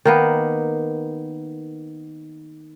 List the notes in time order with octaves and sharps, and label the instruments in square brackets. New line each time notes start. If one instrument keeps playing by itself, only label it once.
[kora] D#3 A#3 B3